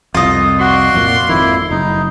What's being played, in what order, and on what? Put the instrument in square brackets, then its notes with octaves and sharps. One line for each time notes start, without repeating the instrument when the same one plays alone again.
[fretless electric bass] C2 F2 [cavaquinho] F4 D#5
[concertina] F#4 [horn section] D5 F5 C6
[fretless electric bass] F2 A#2
[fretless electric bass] G#1 F2 D#3 [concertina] E4
[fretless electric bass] F#1 [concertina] D#4